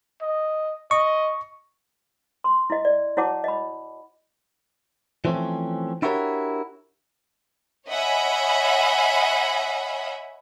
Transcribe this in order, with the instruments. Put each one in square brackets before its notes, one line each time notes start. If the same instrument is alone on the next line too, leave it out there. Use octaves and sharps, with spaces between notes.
[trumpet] D#5
[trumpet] D#5 [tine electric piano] C#6
[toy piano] C6
E4 D#5
D5
E4 F#4 C#5 F#5 A5 D6
D#5 B5
[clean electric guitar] E3 F3 A3 C4 C#4
D4 E4 F#4 G4 A#4 C#5
[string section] C#5 D#5 E5 F#5 G#5 B5